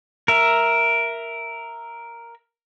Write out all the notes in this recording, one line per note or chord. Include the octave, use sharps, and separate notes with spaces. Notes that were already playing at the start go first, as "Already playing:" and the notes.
A#4 E5